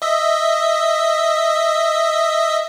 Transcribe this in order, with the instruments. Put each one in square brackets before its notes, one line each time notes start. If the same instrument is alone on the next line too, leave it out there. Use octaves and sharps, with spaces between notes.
[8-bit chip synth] D#5 E5